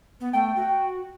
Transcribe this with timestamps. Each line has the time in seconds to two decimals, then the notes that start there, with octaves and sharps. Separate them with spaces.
0.20 B3
0.33 A3 G5
0.56 F#4